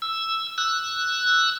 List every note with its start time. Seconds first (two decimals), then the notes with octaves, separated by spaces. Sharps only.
0.02 E6
0.58 E6 F#6